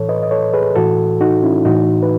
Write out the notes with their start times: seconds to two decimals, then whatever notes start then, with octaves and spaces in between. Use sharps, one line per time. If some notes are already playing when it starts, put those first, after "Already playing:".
Already playing: A2 E3 A4 C#5
0.09 B4 D#5
0.23 D#5
0.31 A4 C#5
0.54 G#4 B4
0.76 A2 E3 F#4 A4
1.21 D#4 F#4
1.43 C#4 E4
1.65 A2 E3 D#4 F#4
2.03 B4